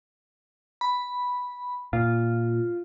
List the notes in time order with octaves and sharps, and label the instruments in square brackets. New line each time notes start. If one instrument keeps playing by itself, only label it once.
[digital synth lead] B5
[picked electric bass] A#2 [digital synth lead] F4